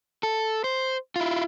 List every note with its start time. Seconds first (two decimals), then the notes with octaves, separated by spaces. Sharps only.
0.23 A4
0.64 C5
1.16 E4 F4